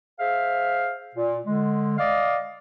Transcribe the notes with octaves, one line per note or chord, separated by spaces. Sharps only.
G#4 C5 E5 F5
A#2
D3 G#3
D5 D#5 F5